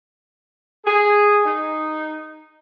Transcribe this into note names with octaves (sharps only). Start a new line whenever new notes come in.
G#4
D#4